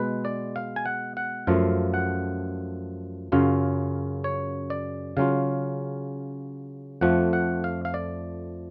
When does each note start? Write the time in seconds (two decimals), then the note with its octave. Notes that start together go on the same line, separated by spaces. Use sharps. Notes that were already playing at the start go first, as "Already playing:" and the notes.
Already playing: B2 G#3 B3 B4
0.25 D5
0.56 F5
0.76 G#5
0.86 F#5
1.17 F#5
1.47 F#2 F3 A3 F4 F5
1.94 F#5
3.32 F#2 C#3 F#3 C#4 F4 F5
4.24 C#5
4.70 D5
5.17 C#3 F#3 C#4 F4 F5
7.01 F2 F3 A3 F#5
7.33 F#5
7.64 F5
7.85 F5
7.94 D5